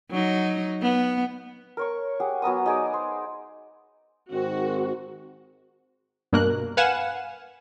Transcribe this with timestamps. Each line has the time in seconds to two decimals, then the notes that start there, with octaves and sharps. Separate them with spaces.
0.11 F#3 D#4
0.82 B3
1.77 A#4 C#5 C#6
2.20 G4 G#4 F#5
2.42 F#3 B3 A#5 D#6
2.66 D#4 G#4 D5
2.94 C5
4.31 G#2 D#3 C4 F#4
6.33 G2 B2 A#3 A#4 F#6
6.77 B4 F5 F#5 G#5 E7